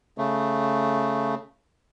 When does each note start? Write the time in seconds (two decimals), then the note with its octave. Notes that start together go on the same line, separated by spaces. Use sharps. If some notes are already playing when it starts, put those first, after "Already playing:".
0.18 C#3 A3